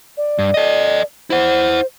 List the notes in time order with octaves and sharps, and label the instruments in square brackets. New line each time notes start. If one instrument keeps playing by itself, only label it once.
[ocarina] D5
[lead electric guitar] G2
A4 D#5
[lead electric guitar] E4 F#5 [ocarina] C5